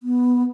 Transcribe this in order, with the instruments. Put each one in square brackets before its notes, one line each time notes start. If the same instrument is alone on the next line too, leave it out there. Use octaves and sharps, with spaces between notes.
[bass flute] B3